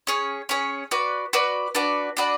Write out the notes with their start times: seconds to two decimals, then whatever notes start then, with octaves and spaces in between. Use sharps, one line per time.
0.07 C#4 G#4 C#5
0.49 C#4 G#4 C#5
0.91 F#4 B4 D5
1.33 F#4 B4 D5
1.75 D4 F#4 B4 D5
2.17 D4 F#4 B4 D5